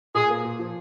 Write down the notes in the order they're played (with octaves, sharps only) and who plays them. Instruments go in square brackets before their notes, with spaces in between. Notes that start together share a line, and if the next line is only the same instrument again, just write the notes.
[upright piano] A#2 [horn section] G#4
[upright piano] A#3
A#2
F3